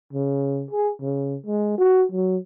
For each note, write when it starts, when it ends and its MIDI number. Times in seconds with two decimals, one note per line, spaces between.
0.13 0.65 49
0.71 0.90 68
1.01 1.36 49
1.46 1.76 56
1.78 2.04 66
2.12 2.37 54